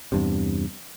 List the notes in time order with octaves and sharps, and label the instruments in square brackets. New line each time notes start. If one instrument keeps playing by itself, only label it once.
[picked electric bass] E2 G2 C3